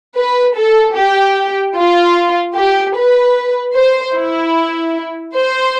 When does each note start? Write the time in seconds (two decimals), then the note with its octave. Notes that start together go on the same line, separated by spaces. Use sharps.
0.17 B4
0.57 A4
0.97 G4
1.77 F4
2.56 G4
2.96 B4
3.76 C5
4.16 E4
5.35 C5